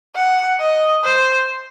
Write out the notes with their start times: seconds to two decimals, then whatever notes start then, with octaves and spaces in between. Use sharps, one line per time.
0.16 F#5
0.60 D#5
1.04 C5